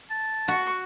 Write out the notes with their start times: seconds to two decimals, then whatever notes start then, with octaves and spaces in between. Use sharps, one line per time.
0.10 A5
0.48 F#4 C#6